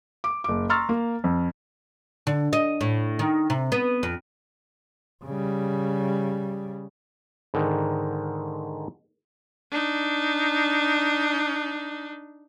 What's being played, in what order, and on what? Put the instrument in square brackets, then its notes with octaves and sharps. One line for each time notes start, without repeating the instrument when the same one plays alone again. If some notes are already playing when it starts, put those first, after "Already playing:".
[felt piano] D6
F#1 D6
A#5 C6 C#6 E6 F6 A6
A#3
F2
[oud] D3
D#5
A2
D#3
C3
B3
F2
[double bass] C#3 G3
[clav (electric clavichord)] G#2 D3 D#3
[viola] D4 D#4